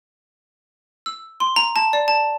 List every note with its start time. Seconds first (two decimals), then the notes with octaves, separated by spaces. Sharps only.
1.06 E6
1.40 C6
1.56 A#5
1.76 A5
1.93 D5
2.08 A5